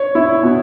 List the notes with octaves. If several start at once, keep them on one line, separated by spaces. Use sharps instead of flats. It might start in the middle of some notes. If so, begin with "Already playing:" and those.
Already playing: C#5
E4
B2